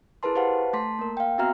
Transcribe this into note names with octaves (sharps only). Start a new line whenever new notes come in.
E4 G#4 A#4 B4 A5 C6
G4 B4 C5 F5 F#5 A5
A3 A5 C6 B6
A#3 A#4
F5 G5
B3 C4 F#4 E5 A#5 F6